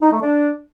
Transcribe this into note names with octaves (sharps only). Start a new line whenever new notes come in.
D#4
A3
D4